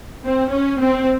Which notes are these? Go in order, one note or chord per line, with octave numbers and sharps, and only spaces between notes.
C4
C#4
C4